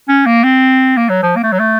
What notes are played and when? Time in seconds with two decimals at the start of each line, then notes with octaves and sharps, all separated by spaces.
0.08 C#4
0.26 A#3
0.44 C4
0.97 A#3
1.09 F#3
1.23 F3
1.36 A#3
1.43 A3
1.52 F#3
1.59 A3